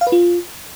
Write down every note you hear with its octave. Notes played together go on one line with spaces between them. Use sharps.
F5
B4
F4